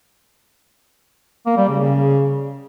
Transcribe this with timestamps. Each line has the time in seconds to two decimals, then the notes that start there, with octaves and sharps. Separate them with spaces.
1.46 A#3
1.57 G3
1.68 C#3
1.79 C#3